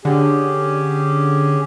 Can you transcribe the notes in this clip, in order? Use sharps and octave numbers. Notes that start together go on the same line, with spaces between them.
D3 C#4 G4 G#4